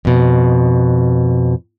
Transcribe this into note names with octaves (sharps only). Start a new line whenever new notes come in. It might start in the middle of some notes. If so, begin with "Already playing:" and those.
F2 B2